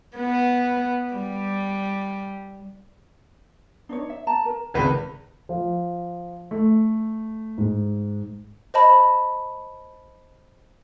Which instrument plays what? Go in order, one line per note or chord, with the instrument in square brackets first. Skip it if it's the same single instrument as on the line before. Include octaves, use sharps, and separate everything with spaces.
[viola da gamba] B3
G3
[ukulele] D4 D#4 C#5
E5
A5 A#5
A#4
[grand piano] G#1 C#2 B4
F3
A3
G#2
[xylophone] C5 D#5 A5 B5